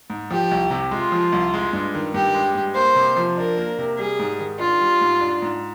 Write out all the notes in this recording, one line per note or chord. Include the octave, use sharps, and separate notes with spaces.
G#2
F3 G4
C2
C3
G#3 F4
F3
C2
G#3
G2
D#3
G2 G4
G#3
G2
A#3 C5
C3
F3
D4 A#4
A#3
C3
G3 G#4
G#2
D#3
D4 F4
G3
G#2
D4
G#2